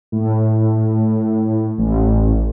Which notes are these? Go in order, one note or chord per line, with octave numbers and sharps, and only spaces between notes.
A2
A1